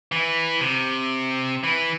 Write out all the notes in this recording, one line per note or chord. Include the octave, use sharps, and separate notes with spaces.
E3
C3
E3